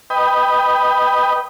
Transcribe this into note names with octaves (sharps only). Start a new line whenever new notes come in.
B4 D#5 G5